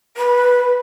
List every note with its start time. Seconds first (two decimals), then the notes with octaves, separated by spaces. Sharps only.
0.16 B4